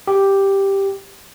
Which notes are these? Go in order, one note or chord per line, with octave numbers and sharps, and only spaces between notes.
G4